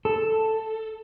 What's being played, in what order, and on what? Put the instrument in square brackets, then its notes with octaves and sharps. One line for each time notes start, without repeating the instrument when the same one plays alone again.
[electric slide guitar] A4